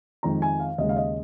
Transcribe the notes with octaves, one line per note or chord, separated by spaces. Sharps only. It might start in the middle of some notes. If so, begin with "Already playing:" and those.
F2 D#3 G#3 A#5
G#5
F5
D#2 C#3 G#3 D#5
F5
D#5